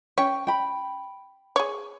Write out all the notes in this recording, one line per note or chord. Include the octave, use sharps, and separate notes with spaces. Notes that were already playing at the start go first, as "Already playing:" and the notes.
C#4 C#5 G5
G5 B5
G#4 C#5